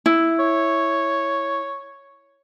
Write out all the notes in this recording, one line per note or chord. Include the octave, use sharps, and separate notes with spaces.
E4
C#5